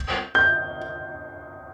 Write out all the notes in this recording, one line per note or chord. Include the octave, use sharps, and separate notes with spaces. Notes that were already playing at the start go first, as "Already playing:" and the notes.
Already playing: G6
G6